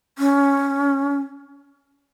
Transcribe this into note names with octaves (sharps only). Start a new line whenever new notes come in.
C#4